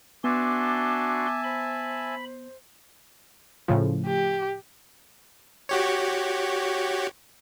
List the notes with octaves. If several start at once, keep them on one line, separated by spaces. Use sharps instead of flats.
B3 D4 F#4 E5 G#5 A5 C6 D6
C5 B5
A2 C#3 F3
G4
F#4 G4 C#5